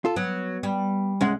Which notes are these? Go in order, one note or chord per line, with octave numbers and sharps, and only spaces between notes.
F4 A4
F#3 B3
G3
C2 G#3 C#4 F#5